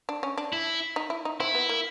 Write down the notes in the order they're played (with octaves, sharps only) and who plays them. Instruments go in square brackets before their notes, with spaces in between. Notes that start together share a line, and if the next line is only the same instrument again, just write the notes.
[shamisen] D4
C#4
D4
[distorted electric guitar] E4
[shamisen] D#4
E4
D#4
[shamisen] C4 [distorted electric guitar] E4
[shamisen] B3
A#3